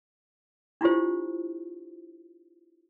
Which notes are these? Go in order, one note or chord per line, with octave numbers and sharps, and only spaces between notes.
D4 E4 F4 G4 C5